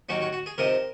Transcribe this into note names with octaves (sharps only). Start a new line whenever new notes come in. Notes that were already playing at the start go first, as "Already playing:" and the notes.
D#2 D#3 F#3 C#4 F#4
F#4
F#4
G#4
C3 F3 C4 D#4 A#4